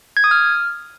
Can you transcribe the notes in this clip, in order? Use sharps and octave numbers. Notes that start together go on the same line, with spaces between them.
G#6
D#6
F6